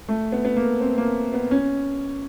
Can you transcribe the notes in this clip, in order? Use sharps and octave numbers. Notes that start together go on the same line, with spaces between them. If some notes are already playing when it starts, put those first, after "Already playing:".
A3
B3
B3
A#3
C4
A#3
B3
C#4